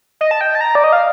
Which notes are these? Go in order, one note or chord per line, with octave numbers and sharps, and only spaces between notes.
D#5
A5
G5
A5
A#5
D5
D#5
F5